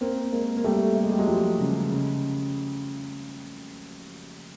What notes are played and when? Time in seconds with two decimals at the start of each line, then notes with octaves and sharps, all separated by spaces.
0.01 A#3 C4
0.32 G#3 A#3
0.57 A#3
0.64 G3 A3
0.95 A3
1.04 G#3
1.11 G3
1.19 F#3 G#3
1.26 F3 G3
1.59 C#3
1.90 C#3